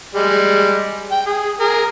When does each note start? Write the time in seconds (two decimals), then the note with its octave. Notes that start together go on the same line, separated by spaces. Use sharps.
0.15 G3 G#3
1.11 G5
1.26 G#4
1.60 G#4 A#4